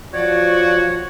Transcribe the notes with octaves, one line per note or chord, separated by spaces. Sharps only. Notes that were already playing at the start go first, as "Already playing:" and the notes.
F3 F#4 C#5 D5